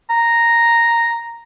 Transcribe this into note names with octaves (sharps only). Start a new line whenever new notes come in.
A#5